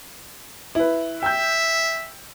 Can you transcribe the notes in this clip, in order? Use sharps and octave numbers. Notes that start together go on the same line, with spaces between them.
E4 B4
E5 G5 E6 G6